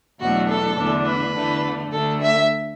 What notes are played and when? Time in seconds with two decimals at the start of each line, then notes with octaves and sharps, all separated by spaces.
0.20 E2 B2 F#3 A3 D4 F#4
0.48 A4
0.77 E2 D3 A3 D4
1.06 B4
1.35 E2 D3 A3
1.92 D2 D3 A3 D4 A4
2.21 E5